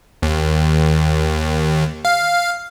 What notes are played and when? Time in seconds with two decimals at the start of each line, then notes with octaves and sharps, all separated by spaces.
0.22 D#2
2.05 F5